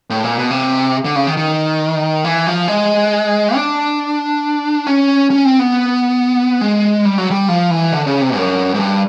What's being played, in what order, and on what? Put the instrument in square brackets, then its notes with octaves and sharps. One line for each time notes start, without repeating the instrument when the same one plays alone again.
[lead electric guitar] A2
A#2
B2
C3
D3
C#3
D#3
D#3
E3
F3
G#3
D4
C#4
C#4
C4
B3
G#3
G3
F#3
G3
F3
E3
D3
C#3
C3
F#2
G#2
G2